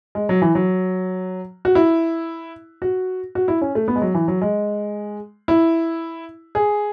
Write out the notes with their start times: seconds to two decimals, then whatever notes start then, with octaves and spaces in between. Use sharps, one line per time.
0.15 G#3
0.29 F#3
0.42 E3
0.55 F#3
1.65 F#4
1.75 E4
2.82 F#4
3.35 F#4
3.48 E4
3.61 C#4
3.75 A3
3.88 B3
3.96 G#3
4.02 F#3
4.15 E3
4.28 F#3
4.42 G#3
5.48 E4
6.55 G#4